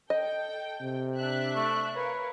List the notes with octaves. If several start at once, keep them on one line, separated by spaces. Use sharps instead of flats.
A4 D#5 G5
C3
D4 E5 F#6
A3
A#4 B4 C#5 F5